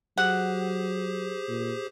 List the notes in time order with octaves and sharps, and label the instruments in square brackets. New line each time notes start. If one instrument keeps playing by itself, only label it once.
[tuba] F#3 [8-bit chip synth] G4 G#4 C5 [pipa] F#5
[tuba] A#2